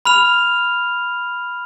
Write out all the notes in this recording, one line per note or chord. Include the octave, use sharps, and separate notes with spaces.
B5 F6 F7